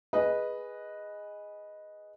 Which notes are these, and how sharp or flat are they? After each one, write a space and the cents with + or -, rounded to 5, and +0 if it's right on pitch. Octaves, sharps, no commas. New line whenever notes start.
G#4 -5 B4 -5 D#5 +0